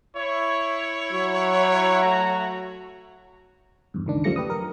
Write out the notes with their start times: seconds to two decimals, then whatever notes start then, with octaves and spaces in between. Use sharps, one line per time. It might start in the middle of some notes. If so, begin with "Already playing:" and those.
0.17 E4 C#5
1.12 F#3
2.02 A3 F#4 A#5
3.94 E2 G2
4.06 C#2 D#3 D4
4.24 F#2 F3 G3 A3 A#6 C#7
4.36 G4 B4 D#6
4.50 A#4